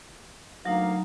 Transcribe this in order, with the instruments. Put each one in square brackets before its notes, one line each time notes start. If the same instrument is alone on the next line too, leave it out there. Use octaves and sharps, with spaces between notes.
[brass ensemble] D2 A#3 F5 [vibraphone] F#3 D#4 A#5